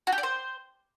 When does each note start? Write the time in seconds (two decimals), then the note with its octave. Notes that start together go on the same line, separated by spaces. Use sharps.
0.07 F#4
0.12 G4
0.18 D5
0.23 C5